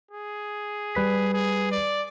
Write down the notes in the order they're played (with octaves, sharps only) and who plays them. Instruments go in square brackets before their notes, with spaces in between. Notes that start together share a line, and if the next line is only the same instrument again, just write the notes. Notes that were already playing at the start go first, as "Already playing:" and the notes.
[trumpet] G#4
[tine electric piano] G3 B4 B6
[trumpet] G#4
D5